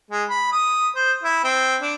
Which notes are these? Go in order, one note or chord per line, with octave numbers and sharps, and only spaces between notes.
G#3
B5
D#6
C5
E4
C4
D4